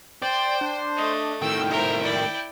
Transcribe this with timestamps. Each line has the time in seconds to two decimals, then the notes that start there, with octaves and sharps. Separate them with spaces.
0.22 C5 D5 G5
0.61 D4
0.97 A3 D#5
1.42 A2 D#3 G5 E6
1.71 A#4 C5 E5
2.02 E4 D5